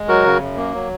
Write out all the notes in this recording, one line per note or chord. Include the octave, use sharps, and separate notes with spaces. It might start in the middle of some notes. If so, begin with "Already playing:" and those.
Already playing: G#3
F#3 F#4 A#4
C#3
F#2
A#3
F#3